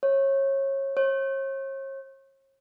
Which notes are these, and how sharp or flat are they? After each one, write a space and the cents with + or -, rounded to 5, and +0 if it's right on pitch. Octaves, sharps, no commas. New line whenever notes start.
C#5 -25
C#5 -40